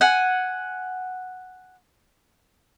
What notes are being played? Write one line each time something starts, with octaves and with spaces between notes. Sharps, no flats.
F#5 G#5